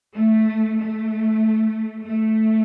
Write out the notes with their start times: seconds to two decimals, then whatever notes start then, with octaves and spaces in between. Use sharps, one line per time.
0.16 A3
0.77 A3
2.02 A3